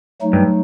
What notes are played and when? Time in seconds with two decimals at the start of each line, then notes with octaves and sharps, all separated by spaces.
0.22 F#3 A3 D#4
0.33 G2